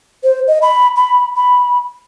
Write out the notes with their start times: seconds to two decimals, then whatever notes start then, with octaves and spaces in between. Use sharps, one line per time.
0.24 C5
0.47 D#5
0.62 B5
0.96 B5
1.36 B5